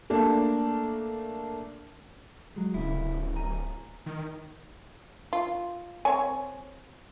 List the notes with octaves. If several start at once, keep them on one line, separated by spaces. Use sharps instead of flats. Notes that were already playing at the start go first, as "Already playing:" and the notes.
A3 A#3 D4 A5
F#3 G#3
D1 C#3 E4
G#5 A#5
D#3
F4
C4 C#5 G#5